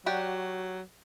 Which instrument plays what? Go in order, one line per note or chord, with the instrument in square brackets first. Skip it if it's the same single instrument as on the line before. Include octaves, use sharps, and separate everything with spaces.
[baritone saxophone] F#3 [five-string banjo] F#4 G4 D5